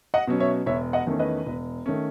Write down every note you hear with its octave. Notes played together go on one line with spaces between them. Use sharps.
D#5 F#5
B2 F#3 C#4
C#5 E5
E1 C#5 E5
D#5 F#5
E2 D#3 A3 C#4
B4 D#5
E1
D#3 A3 C#4